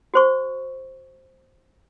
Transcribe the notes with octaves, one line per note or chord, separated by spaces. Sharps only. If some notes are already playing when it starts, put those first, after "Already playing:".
F#4 C5 C#6